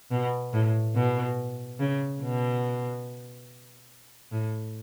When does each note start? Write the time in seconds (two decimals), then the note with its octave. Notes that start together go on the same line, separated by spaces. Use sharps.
0.11 B2
0.53 A2
0.95 B2
1.80 C#3
2.22 B2
4.32 A2